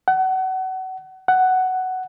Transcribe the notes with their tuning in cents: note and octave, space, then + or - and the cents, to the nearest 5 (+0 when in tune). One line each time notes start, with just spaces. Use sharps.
F#5 +30
F#5 +10